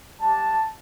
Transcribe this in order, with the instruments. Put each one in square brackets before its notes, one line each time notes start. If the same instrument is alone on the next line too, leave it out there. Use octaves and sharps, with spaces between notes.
[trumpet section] G3 D4 G4 A5